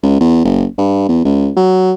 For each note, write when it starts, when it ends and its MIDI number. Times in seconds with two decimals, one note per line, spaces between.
0.03 0.20 37
0.21 0.41 40
0.45 0.65 30
0.78 1.06 43
1.09 1.20 40
1.25 1.50 37
1.57 1.93 54